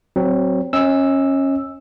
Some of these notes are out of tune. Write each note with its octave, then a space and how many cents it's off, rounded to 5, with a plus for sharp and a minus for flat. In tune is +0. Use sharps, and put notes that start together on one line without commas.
F#3 +15 C4 +0
C#4 -20 D#5 +30 E6 +0